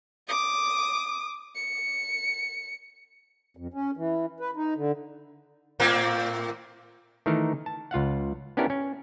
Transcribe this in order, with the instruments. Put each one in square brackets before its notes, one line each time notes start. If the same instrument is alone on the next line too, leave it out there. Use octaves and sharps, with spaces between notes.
[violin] D6 D#6
C#7
[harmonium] F2
C#4
E3
B4
D#4
D3
[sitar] A2 A#3 C4
[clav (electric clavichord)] D#3 E3 A3 D#4 A#4
A5
C#2 F4 F5 F#5
B3 C#4 D4 E4 G4 A#4
C#4